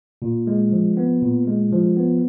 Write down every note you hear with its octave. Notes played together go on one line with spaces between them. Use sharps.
A#2
G#3
F3
B3
A#2
G#3
F3
B3